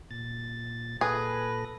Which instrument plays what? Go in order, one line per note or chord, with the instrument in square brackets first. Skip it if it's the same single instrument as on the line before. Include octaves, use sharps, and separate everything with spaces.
[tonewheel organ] A#2 A6
[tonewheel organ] A#2 A4 A#6 [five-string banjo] G#4 [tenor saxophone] B4